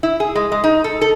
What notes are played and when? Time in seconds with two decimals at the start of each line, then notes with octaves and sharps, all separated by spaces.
0.03 E4
0.20 G#4
0.36 G#3
0.52 G#3
0.64 D#4
0.84 A4
1.01 A4